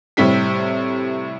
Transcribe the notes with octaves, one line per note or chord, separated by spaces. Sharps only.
A2 C3 G3 G4 B6